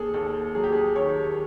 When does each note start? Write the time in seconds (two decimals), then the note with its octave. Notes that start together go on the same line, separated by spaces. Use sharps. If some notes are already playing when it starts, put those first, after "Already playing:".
Already playing: D#2 G#4 A4
0.14 D#2 A4
0.55 F#3 G#4
0.64 G4
0.73 G#4
0.96 D#3 C#5